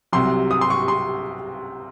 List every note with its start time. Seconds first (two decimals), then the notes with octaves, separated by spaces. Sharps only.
0.12 C2 C3 F#3 C6
0.51 D#6
0.61 C6
0.70 C#6
0.88 C6